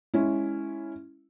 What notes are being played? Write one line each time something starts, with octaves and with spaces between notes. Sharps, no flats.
G#3 C#4 E4